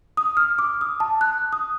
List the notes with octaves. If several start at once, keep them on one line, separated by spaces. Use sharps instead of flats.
D#6
F6
D6
D#6
A5
F#6
D#6